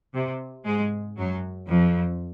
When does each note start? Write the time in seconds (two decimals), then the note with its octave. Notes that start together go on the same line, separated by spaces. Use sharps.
0.14 C3
0.65 G#2 G#3
1.18 F#2 F#3
1.69 F2 F3